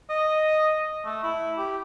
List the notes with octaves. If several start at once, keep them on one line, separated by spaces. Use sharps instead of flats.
D#5
A3
E4
G4